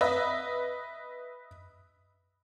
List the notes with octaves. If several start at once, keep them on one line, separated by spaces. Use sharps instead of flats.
B4 D#5 E5